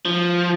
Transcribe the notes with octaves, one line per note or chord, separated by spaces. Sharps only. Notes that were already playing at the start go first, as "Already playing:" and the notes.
F3